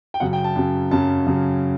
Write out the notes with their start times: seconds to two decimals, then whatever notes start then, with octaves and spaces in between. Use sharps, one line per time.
0.14 G5
0.20 F#2 C#3 F#3 F#5
0.33 G5
0.44 A5
0.56 F#2 C#3 F#3
0.91 F#2 C#3 F#3 A5
1.26 F#2 C#3 F#3